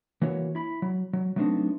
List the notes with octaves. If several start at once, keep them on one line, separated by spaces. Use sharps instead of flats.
E3 A#3 F#4 C#5
E4 B5
F#3
F#3
F#3 A3 B3 C4 D4 D#4